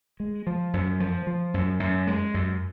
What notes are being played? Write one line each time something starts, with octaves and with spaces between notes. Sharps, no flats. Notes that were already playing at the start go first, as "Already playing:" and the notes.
G#3
F3
F#2
F3
F3
F#2
F#2
G#3
F#2